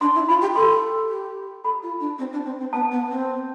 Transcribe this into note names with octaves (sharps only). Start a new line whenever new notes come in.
D4 C6
E4
F4 B5
G4
A4 C6
G4
A4 B5
F4
D4
C4
D4
C4
C4
B3 A5
B3
C4